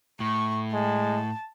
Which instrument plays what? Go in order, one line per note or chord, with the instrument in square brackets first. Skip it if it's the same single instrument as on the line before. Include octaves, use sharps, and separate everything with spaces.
[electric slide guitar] A2 [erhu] C#6
[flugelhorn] G#3 [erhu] A5